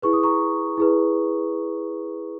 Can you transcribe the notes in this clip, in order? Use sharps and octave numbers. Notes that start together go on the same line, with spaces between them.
E4 G#4 B4 C#6
D#6
A#5 C#6
E4 G#4 B4